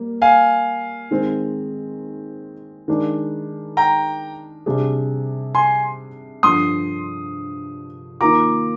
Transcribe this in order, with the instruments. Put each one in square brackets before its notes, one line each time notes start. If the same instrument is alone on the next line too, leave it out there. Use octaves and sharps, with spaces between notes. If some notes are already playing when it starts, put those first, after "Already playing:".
Already playing: [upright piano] G3 A#3
[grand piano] F5 G#5
[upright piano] D#3 G#3 C4
D#3 G#3 D4
[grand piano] G5 A#5
[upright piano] C3 G3 D4 G#4
[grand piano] G#5 C6
[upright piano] G2 D3 F3 [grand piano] C6 D#6
[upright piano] D#3 A#3 F4 [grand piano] A#5 D6